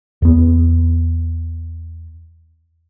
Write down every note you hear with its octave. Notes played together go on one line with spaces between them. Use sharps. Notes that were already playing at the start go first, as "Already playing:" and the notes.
E2 B3